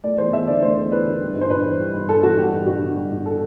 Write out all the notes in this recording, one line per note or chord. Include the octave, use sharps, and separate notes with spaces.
A3 D5
E2 C5
E2 E5
D3 D5
A3 C5
E2
E2 B4
D3
G3
G2
C5
G2 B4
E3
G3
G2
G2 A4
E3 F#4
G3 G4
G2
G2 F#4
D3
G3
G2
A4